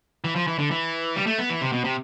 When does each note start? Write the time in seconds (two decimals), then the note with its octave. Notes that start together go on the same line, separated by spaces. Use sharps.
0.24 E3
0.36 F3
0.47 E3
0.59 D3
0.71 E3
1.16 G3
1.27 A3
1.39 B3
1.50 E3
1.61 C3
1.72 B2
1.84 C3